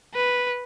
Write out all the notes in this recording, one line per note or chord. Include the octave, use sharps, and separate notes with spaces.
B4